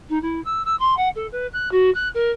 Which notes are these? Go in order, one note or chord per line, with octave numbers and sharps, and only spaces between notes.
D#4
E4
E6
E6
C6
F#5
A4
B4
F#6
F#4
F#6
A#4